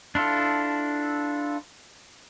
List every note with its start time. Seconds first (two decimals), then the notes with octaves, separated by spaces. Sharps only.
0.15 D4 E4 F4 A4